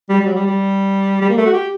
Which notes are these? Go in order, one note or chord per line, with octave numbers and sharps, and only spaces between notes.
G3
G3
F#3
G3
G3
G3
A#3
A3
F#4
G4